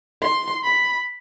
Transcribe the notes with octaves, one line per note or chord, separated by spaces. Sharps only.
C6
B5